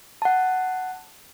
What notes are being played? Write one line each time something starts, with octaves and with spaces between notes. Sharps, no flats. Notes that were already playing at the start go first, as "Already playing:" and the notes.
F#5 A5